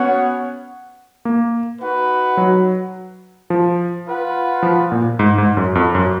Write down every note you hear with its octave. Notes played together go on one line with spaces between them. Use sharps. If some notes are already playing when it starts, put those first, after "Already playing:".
Already playing: B3 C#4 F#4 C#5 F#5
A#3
D#4 F#4 B4 F#5
F#3
F3
F4 B4 F#5
F3
A#2
G#2
G#2
F#2
F2
F#2